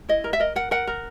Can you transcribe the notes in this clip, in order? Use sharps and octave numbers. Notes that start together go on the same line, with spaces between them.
E4 D#5
A#4
E5
A#4 D#5
A#4 F#5
A#4 F#5
A#4